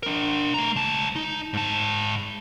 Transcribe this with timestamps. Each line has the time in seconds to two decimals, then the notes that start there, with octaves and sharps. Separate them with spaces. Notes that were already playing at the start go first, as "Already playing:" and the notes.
0.03 D4 A#4
0.54 A3 A#5
0.76 C#2 A5
1.16 D#4
1.53 G#2 A5